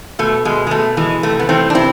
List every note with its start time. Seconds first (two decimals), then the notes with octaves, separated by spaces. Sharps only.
0.19 B2 A3
0.45 B2 G#3
0.67 G#3
0.71 B2 A3
0.97 E3 G#3
1.23 C3 A3
1.39 B3
1.49 E3 A3 C4
1.70 D4
1.75 C3 C4 E4